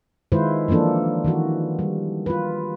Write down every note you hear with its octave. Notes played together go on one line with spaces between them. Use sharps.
D#3 G#3 E4 F4 B4 C5
E3 F3 A#3 D4 A4
D#3 E3 F#4
G3
F4 B4